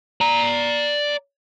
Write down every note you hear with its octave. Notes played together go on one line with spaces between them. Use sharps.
D5 A#5